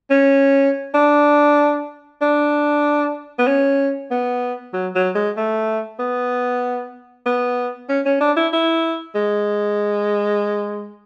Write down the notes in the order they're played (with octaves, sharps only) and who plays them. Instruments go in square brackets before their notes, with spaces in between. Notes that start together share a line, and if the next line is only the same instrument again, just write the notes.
[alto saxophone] C#4
D4
D4
B3
C#4
B3
F#3
F#3
G#3
A3
B3
B3
C#4
C#4
D4
E4
E4
G#3